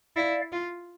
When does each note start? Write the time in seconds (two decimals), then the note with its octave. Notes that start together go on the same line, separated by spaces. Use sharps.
0.16 E4 D5 F5
0.52 F4